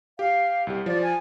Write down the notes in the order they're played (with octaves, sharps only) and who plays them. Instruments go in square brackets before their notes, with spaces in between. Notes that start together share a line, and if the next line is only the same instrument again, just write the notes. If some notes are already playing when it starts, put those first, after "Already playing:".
[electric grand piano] G4 [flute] F5
[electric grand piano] C2 G4
[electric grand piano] F3 [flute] D5
[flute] G#5